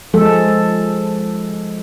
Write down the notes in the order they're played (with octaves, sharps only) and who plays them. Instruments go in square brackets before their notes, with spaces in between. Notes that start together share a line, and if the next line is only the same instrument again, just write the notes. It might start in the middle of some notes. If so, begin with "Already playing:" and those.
[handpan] F3 G#3 A4